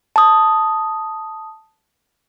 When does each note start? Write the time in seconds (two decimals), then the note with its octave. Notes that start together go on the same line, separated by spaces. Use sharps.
0.16 A5 D#6